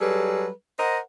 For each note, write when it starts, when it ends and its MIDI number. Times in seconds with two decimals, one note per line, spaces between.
0.01 0.49 54
0.01 0.49 55
0.01 0.49 68
0.01 0.49 69
0.01 0.49 71
0.79 0.99 70
0.79 0.99 72
0.79 0.99 75
0.79 0.99 78